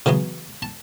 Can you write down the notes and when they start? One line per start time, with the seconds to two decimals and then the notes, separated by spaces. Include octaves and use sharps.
0.06 C#3 E3 F#3 B3
0.62 A5